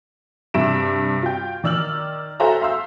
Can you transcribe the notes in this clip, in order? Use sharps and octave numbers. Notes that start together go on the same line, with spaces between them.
G2 C3 E5 D7 E7
F4 G5
D#3 D5 E6 F6 F#7
F#4 A4 C5 E5 A#5
E5 F5 C6 E6